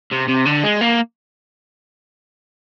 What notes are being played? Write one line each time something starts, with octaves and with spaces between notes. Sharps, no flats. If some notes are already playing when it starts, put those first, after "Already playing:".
C3
C3
D3
G#3
A#3